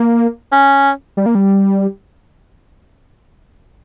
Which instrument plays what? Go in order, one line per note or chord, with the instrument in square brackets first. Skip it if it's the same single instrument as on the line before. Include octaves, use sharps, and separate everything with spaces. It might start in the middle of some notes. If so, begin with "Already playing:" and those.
Already playing: [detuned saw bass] A#3
[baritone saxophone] C#4
[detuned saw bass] G3
A#3
G3